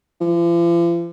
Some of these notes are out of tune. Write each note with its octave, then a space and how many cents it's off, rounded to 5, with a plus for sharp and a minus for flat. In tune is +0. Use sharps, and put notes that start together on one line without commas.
F3 -45